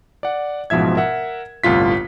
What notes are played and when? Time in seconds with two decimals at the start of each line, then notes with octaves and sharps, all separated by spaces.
0.23 D5 F#5
0.70 A1 G#2 B2 F3 E5 G#6
0.96 A#4 E5 F#5
1.64 G1 C2 A2 F4 B6